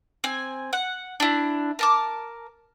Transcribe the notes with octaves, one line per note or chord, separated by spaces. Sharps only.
C4 G#5
F#5
D4 E4
A#4 A5 D6